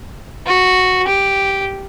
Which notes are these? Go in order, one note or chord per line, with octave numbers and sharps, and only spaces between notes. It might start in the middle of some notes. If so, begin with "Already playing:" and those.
F#4
G4